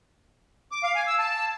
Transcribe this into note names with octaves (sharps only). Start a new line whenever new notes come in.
D6
F5
G#5
E6
A5